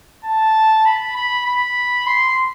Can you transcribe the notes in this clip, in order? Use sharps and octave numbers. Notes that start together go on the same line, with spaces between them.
A5
B5
B5
B5
C6